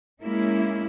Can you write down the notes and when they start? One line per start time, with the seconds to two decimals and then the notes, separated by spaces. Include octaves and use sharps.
0.21 G#3 A#3 C#4 E4